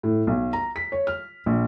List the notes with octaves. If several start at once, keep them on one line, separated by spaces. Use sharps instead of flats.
A2
B1
A#5
B6
C#5
F6
A#1